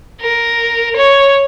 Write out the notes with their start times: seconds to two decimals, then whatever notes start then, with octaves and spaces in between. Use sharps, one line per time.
0.21 A#4
0.96 C#5